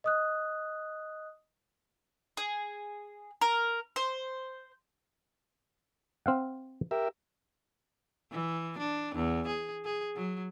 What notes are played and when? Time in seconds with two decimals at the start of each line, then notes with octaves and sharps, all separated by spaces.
0.04 D#5 D#6 F#6
2.37 G#4
3.41 A#4
3.96 C5
6.26 C4 F5 F#5
6.91 G4 A#4 E5
8.32 E3
8.78 D4
9.15 E2
9.47 G#4
9.85 G#4
10.16 F#3